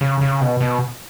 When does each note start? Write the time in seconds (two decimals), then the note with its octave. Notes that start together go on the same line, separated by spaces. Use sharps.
0.01 C#3
0.21 C#3
0.41 B2
0.61 B2